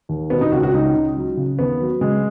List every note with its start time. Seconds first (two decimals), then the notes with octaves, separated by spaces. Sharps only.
0.09 D#2
0.30 B2 B3
0.41 D#4
0.52 C#2 F#4
0.63 F#4
0.73 C#2 D#4
0.95 C#2
1.17 F#3
1.37 C#3
1.59 D#2 B3
1.80 F#3
2.01 C#3 G#3